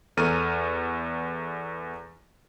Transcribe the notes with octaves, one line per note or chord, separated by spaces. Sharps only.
E2 A4 A#5 F6 D#7